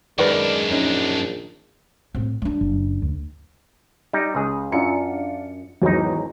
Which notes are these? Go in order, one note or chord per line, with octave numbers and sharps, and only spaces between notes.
F#2 D#3 G#3 D4 A#4 B4 D5
A#1 C#4 D#4
A2 C4
G3 D4
F#1
D2
G3 D#4
C#2 G#4
F#2 D4 F4 C#7
G#1 E2 F#3 D#4